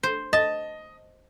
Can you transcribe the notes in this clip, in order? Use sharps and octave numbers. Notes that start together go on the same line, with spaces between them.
C5
D#5 A5